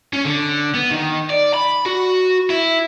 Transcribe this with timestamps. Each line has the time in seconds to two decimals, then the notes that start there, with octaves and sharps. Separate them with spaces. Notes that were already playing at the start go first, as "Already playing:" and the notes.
0.13 C#4
0.25 D3
0.74 B3
0.90 D#3
1.30 D5
1.54 B5
1.86 F#4
2.50 E4